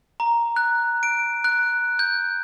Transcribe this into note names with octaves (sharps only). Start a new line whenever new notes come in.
A#5
F#6
D7
F#6
G6